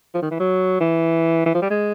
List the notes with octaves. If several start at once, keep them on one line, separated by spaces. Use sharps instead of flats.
F3
D#3
E3
F#3
E3
E3
F3
G3
G#3